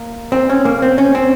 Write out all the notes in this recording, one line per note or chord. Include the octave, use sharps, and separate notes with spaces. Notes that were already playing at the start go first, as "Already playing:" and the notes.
Already playing: A#3
C4
C#4
A#3
C4
C#4
C4